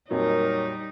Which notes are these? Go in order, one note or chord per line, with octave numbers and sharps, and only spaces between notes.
F2 A#2 F#3 G3 D#4 A#4 C#5